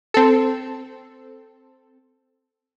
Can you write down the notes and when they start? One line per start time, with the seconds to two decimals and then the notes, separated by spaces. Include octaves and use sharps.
0.14 C4 A4